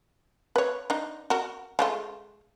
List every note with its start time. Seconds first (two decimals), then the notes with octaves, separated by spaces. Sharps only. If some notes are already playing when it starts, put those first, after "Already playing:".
0.56 B4 C#5
0.90 D4 D#4
1.30 F#4 A#4
1.79 G#3 A3 F4